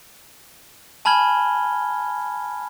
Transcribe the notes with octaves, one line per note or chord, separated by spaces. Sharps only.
G#5 A5 B5 F6 G#6 G7